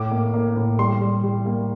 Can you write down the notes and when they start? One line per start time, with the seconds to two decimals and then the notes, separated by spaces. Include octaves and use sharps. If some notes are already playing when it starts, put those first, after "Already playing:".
Already playing: A2 D6
0.11 A#3
0.34 A#3
0.56 A2
0.79 G3 C6
1.01 G3
1.24 G3
1.46 A#3